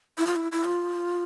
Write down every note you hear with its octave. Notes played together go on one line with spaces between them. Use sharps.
E4
F4
E4
E4
F4